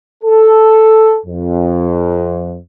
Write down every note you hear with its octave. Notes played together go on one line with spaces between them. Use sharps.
A4
F2